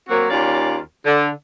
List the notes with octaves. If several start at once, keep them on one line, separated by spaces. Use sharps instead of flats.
F#3 A#3 C4 F#4
D#2 C#4 F4 D5
D3